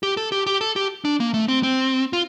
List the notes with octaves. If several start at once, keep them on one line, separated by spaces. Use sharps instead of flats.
G4
A4
G4
G4
A4
G4
D4
A#3
A3
C4
C4
F4